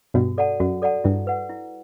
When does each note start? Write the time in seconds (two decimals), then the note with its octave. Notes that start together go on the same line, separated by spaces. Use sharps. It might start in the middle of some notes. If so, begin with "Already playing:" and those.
0.14 G2 B2 F#4
0.38 A4 D5 F#5 A5
0.60 F#2 F#4
0.82 A4 D5 F#5 A5
1.04 G2 E4
1.27 B4 F#5
1.49 E4